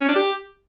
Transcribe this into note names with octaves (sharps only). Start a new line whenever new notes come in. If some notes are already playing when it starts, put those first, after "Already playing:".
C#4
D4
G4